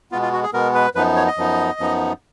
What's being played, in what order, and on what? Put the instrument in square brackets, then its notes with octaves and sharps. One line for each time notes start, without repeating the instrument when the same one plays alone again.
[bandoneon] B2 G#3 B3 F4
F4
F#4
G#4
B2 G#3 B3 A#4
B4
F#2 F3 B3 D#4 B4
C#5
D#5
F#2 F3 B3 D#4
F#2 F3 B3 D#4